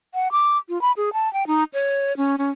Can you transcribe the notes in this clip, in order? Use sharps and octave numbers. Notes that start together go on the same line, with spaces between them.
F#5
D6
F4
B5
G#4
A5
G5
D#4
C#5
C#4
C#4